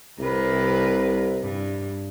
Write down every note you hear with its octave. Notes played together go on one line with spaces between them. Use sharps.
C2 C3 A#4 B4
G2